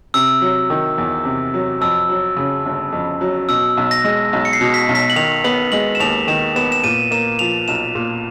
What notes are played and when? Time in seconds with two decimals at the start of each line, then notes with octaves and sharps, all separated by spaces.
0.14 C3 E6
0.41 F#3
0.70 D#3
0.98 E2
1.25 C3
1.54 F#3
1.81 F2 E6
2.09 F#3
2.37 C#3
2.66 G1
2.92 F2
3.21 F#3
3.49 B2 E6
3.77 B1
3.91 A#6
4.04 G#3
4.33 B1
4.45 C#7
4.53 C7
4.61 B2
4.74 B6
4.89 B1
4.95 B6
5.10 F#7
5.16 D#3 F7
5.44 B3 F#7
5.72 G#3 F#7
5.95 E7
6.00 D#2 F7
6.28 D#3 E7
6.56 B3 E7
6.72 E7
6.84 A#2 D#7
7.11 A#3 E7
7.39 F3 F7
7.68 B1 E7
7.95 A#2